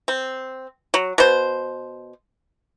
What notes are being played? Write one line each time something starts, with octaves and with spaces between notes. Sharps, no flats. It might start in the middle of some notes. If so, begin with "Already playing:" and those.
C4
F#3
B2 C5